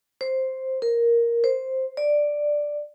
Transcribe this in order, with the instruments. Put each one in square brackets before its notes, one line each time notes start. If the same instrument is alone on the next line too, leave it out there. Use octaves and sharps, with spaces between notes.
[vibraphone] C5
A#4
C5
D5